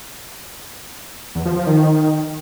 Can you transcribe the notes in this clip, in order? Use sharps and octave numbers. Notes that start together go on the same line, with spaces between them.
E2
F3
F3
D#3